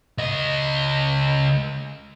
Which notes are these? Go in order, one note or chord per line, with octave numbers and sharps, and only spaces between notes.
C#2 D#5